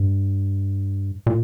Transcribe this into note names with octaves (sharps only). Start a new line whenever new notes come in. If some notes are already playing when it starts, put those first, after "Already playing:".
Already playing: G2
A#2